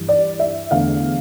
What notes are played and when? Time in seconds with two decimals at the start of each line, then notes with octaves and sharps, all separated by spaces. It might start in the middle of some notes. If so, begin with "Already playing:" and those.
Already playing: G2 E3 G3
0.08 D5
0.39 E5
0.71 E2 D3 A3 F5